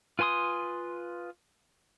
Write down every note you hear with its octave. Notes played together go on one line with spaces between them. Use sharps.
F4 B4 G#5 C6 D#6